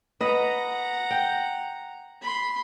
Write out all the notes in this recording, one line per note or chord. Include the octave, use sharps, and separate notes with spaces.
B4 D#5 F#5 A#5
G5
B5 C6